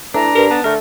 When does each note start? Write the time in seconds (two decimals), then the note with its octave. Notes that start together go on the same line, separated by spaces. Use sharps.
0.14 E3 A3 D4 A#5
0.35 G2 A#4
0.50 B3 A5
0.64 D3 A3 A#4